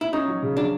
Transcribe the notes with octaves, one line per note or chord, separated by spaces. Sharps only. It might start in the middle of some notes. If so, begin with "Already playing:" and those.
E4
C#4 D#4
F#3
C#3
F#3 D4